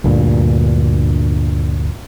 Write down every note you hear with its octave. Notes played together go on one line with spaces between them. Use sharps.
D2 G2 A#2